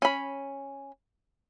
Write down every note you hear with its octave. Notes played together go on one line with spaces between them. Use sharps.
C#4 B5